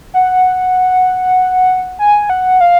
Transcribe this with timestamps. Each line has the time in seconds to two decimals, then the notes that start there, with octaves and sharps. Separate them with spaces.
0.14 F#5
1.99 G#5
2.30 F#5
2.60 F5